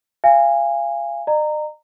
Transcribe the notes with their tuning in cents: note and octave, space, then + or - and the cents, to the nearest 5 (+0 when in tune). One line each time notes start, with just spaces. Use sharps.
F5 -30 G#5 -20
D#5 -45 A#5 -15